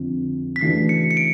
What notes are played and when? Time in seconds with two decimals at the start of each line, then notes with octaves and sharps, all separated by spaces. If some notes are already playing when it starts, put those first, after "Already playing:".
Already playing: F2 D3 F3
0.56 B6
0.61 C#3 E3 A3 D4 F#4 C7
0.89 C#7
1.11 C#7
1.17 D7